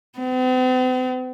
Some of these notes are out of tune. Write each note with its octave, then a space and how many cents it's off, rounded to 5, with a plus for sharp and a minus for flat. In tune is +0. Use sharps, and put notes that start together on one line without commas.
C4 -45